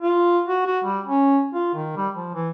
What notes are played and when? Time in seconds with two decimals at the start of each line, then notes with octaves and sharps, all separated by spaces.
0.02 F4
0.48 F#4
0.66 F#4
0.84 G3
1.06 C#4
1.54 F4
1.74 D#3
1.96 G3
2.16 F3
2.34 E3